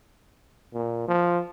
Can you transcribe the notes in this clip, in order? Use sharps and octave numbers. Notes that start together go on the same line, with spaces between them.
A#2
F3